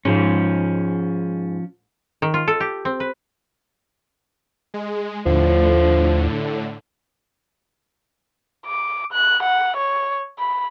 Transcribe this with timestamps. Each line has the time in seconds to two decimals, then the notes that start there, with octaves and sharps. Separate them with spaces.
0.05 G#2 F3 C#4
2.22 D#3
2.34 F4
2.48 A4
2.60 G4
2.85 C4
3.00 B4
4.74 G#3
5.26 D#2 A2 D3 F3
8.66 D6
9.13 F#6
9.43 F#5
9.77 C#5
10.39 B5